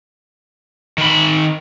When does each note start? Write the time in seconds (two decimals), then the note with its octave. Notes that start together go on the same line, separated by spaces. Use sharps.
0.98 D#3 B5